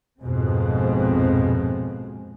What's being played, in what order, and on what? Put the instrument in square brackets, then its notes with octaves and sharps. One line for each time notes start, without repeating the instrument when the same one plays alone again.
[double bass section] A#1 F2 G#2 B2 G#3 C4